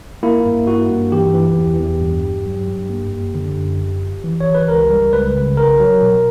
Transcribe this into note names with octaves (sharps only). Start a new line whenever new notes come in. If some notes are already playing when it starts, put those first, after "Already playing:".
A#3 E4
G2
A#3 F#4
G2
E3 G4
E3
E2
E2
G2
G2
F#3
G2
A#3
F#2
D3
F#2
G1
G1
E3
C#5
G1
B4
C#2 A#4
G3
C#2 B4
C#3
B1 A#4
F#3
B2